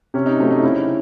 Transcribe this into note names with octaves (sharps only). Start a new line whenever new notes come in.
C3 C#4
D#4
F#3 A3 C4 C#4
D#4
C#3 E4